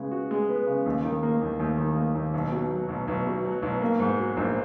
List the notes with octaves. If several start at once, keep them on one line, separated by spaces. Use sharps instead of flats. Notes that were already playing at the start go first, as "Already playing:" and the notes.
Already playing: C#3 G#3 B3
F#4
G#3
B3
C#3
D#2
D#3
A#3
D#2
D#2
D#3
A#3
D#2
B1
B2
F#3
B1
B1
B2
F#3
B1
A#3
G#2
F#3
A#1